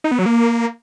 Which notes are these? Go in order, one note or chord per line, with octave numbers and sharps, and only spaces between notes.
D#4
B3
F#3
A#3